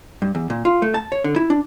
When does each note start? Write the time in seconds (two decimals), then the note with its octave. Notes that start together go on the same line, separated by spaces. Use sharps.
0.22 G2
0.35 E2
0.50 A#2
0.65 F4
0.82 A3
0.94 A5
1.12 C#5
1.24 D3
1.36 E4
1.50 D4